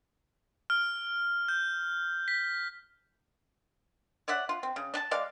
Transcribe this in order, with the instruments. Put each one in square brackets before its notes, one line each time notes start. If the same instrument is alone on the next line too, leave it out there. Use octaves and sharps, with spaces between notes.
[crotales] F6
G6
B6
[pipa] C#5 D5 E5 F#5
F4
C4
C#3
D4 A5
G#3 D5 F5